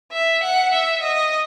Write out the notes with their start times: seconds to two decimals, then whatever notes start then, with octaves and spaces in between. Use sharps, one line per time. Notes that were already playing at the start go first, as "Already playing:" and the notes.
0.12 E5
0.42 F#5
0.71 E5
1.02 D#5